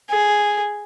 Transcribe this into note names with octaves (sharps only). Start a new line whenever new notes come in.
G#4